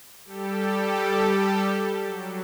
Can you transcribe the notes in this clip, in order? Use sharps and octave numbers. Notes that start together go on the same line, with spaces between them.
G3 G4 A4
F#3